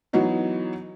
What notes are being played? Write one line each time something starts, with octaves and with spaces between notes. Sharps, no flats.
E3 F#3 B3 D#4 F#4